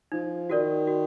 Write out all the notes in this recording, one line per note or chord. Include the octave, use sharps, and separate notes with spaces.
F3 D#4
D#3 F#4 A#4 D5
F#4